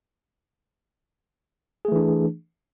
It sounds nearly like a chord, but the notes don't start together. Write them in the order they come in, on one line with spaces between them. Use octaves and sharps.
G#4 A3 E3 D4